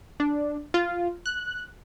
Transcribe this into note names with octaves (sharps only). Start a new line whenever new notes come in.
D4
F4
F#6